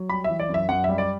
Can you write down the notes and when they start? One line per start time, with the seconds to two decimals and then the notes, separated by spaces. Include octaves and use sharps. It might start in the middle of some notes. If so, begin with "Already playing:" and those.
Already playing: F#3
0.09 G3 B5
0.24 E3 E5
0.40 D5
0.49 F#2
0.54 E5
0.69 F#2 F#5
0.84 G3 E5
0.98 D5